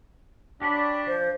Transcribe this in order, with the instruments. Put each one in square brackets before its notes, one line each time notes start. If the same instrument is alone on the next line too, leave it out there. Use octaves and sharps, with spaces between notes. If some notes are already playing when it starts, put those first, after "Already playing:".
[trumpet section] D4 [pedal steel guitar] G4 C#5 B5
[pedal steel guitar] F3 [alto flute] C5